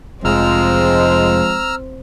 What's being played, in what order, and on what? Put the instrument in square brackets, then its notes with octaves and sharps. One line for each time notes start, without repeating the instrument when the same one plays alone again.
[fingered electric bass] F1 [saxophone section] F3 G#3 [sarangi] C4 [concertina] A#5 E6 F6